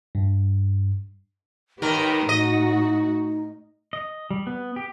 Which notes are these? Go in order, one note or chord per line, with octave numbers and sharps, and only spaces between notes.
G2
D#2 D#3 D#4 G4 A#4 B4
A2 F#4 D#5
D#5
G3
B3
G4